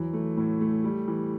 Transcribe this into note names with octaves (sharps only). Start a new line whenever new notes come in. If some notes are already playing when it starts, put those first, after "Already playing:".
Already playing: E2 E3 F#3
A3
A2
A3
G3
E3